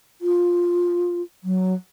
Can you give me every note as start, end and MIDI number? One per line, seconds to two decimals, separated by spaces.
0.21 1.22 65
1.44 1.75 54